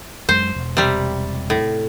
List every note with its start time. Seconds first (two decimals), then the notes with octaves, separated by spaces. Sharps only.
0.29 F#2 G#3 C5
0.56 E1
0.77 C3 G3
1.50 A2